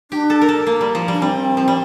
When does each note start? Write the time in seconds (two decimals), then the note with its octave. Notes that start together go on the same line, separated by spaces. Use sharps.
0.11 D4 G4
0.30 A4
0.42 A#4
0.48 A4
0.67 A#3
0.81 G3
0.95 F3
1.08 G3 D4
1.22 G3 C4
1.57 F3
1.68 G3